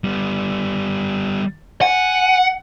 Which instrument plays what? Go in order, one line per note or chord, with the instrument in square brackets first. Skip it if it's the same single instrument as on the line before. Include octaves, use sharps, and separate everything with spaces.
[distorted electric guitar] G3 B3
[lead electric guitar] F#5 [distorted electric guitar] G#5